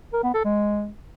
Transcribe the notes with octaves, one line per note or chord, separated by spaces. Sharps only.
A#4
B3
A4
G#3